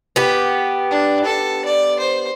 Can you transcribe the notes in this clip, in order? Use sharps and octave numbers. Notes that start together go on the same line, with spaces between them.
B3 G4
D4
A4
D5
C5